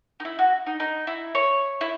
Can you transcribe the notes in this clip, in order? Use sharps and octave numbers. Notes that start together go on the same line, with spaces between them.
D#4
E4
F#4
D#4
D#4
E4
C#5
E4